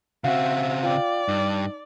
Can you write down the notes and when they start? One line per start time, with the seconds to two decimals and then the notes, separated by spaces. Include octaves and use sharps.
0.24 C#3 C4 F#4 E5 F5
0.83 F4 D5 F5 G5
1.28 G2 D#4